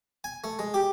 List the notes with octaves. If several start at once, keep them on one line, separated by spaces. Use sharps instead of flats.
G#5
A3
G#3
G4